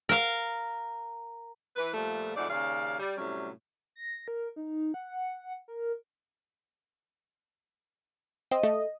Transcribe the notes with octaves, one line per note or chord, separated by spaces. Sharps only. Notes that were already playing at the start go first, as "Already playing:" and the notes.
A#4 F5
E3 B4
A#2 F3 G3 A3
F2 G#2 A3 F#4 D5
D#2 C#3 C#4 D5 F5
G3
A2 C3 F#3 G3 C#4
A#6
A#4
D#4
F#5
A#4
C4 D#5
A3